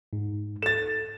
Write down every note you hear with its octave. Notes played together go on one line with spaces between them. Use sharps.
G#2
A4 A6 E7